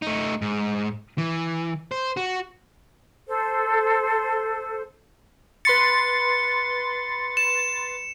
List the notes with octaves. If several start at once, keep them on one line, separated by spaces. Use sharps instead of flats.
A3 D#4
G#2
E3
C5
F#4
A4 C5
B4 C6 A6 C#7
E7